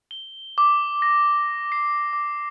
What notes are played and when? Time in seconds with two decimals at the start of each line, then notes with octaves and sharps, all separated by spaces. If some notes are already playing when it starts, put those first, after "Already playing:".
0.11 G7
0.58 D6
1.02 A#6
1.72 C7
2.13 D6